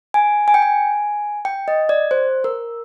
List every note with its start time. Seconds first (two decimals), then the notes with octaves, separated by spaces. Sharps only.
0.14 G#5
0.48 G#5
0.54 G5
0.62 G#5
1.45 G5
1.68 D#5
1.89 D5
2.11 C5
2.44 A#4